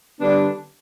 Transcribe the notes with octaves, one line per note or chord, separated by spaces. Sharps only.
D3 G3 B3 D4